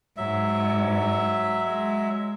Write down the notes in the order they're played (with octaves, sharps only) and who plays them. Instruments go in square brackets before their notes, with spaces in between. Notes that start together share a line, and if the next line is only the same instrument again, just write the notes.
[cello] G#2 [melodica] F#3 E5
[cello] G#3